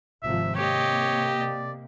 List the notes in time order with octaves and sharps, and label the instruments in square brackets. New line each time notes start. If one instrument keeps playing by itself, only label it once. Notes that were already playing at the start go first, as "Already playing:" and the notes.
[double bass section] G#1 C3 F3 [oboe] E5
[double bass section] C3 A#3 [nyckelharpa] G4 D#5 [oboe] C#5
[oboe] D5